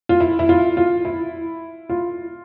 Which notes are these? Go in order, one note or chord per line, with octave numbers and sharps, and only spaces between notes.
F4
E4
E4
F4
F4
E4
F4